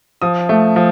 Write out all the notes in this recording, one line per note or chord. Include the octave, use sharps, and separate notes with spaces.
F3 D#6
A3
F3